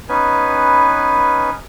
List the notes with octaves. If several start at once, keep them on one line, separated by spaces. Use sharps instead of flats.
B3 C#4 D#4 B4 G#5